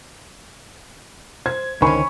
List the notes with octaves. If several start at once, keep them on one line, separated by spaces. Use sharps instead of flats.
C5 G#6
C#2 D3 D#3 C#4 C5 G#5 B5 C#6